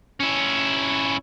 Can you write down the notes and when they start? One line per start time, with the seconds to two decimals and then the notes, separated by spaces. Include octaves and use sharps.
0.20 C#4 E4